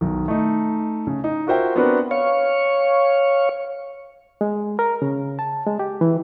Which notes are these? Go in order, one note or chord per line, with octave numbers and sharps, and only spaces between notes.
B1 D#3
A3 D#4
C#3
D#4
F4 F#4 A#4 C5 E5 G5
B3 C4 D4 F#4 A#4 B4
C#5 F5 C#6
G#3
A#4
C#3
A5
G#3
G4
E3